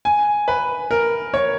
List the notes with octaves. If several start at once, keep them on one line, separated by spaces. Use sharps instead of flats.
G#5
B4
A#4
C#5